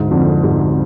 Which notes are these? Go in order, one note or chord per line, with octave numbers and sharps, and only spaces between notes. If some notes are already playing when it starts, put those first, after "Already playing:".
Already playing: D2 G#2
F2 D3 F3
D2 G#2